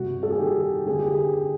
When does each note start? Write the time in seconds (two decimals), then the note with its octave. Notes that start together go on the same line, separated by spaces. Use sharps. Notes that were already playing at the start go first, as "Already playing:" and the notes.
Already playing: G2 C3 F#4
0.23 A4
0.31 G#4
0.39 D#3 G4
0.86 D3 G#4
0.99 G4
1.12 G#4